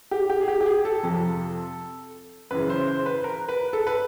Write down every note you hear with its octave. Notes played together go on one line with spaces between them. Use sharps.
G4
G4
G#4
G4
G4
G#4
A4
F2 C3 F3
F#2 C#3 E3 B4
C5
C5
B4
A#4
B4
A4
B4